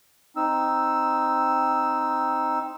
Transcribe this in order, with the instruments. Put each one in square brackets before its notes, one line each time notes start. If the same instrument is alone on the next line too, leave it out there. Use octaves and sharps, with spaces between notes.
[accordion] C4 D#4 E6